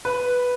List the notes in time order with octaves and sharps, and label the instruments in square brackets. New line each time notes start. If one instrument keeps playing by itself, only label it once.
[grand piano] B4